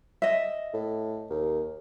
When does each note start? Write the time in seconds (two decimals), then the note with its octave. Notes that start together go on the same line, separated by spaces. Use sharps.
0.22 D#5 E5
0.74 A2
1.30 D#2